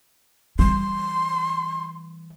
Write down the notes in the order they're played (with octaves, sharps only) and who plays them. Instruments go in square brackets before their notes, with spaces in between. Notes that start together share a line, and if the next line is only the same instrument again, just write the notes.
[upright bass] E3 G3 [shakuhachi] C6